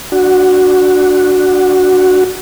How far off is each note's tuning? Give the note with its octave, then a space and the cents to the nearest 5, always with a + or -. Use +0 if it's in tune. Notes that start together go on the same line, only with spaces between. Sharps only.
D4 +0 F#4 +0